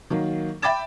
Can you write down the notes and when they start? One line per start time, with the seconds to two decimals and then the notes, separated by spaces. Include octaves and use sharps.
0.10 D#3 F#3 A#3
0.62 E5 G5 B5 D6 A6 E7